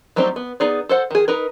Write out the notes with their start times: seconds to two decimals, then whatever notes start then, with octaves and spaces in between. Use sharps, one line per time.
0.16 F#3 G3 A3 C4 D#4
0.36 B3
0.60 B3 D#4 G#4 D5
0.89 A4 C5 F#5
1.11 D#3 G#4
1.28 D#4 A#4 B4